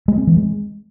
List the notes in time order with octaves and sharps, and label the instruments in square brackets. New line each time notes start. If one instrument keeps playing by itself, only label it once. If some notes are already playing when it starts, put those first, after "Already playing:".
[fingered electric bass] G#3
C4
E3
G#3